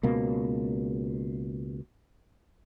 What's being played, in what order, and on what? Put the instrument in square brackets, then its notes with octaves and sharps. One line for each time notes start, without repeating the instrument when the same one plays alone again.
[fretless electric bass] C#2 B2 A#3